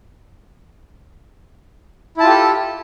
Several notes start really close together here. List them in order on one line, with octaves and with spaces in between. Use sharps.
E4 A5 F4 G4 A4